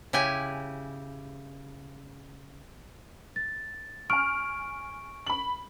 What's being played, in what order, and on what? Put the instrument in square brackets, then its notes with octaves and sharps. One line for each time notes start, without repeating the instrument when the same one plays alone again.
[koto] C#3 E4 G4 G#5
[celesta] A6
[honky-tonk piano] G#5 F6 [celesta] C#6 D7
[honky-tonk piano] B5 F#7